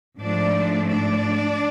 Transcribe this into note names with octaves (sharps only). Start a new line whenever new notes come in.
G#2 F3 A3 D4 D5
D4 D5